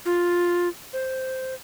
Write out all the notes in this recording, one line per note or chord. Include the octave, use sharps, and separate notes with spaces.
F4
C5